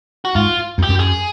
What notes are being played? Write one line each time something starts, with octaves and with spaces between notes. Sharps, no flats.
F#4
G#2 F4
F2
G4
F#2
G#4